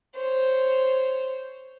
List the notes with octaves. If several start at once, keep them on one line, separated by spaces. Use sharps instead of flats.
C5 C#5